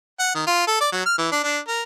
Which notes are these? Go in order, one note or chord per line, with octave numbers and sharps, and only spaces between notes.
F#5
D#3
F4
A4
D5
F#3
F6
E3
D4
D4
A#4